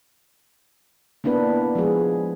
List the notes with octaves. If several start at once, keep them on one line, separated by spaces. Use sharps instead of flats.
A#3 B3 D4 E4 B4
F3 G#3 G#4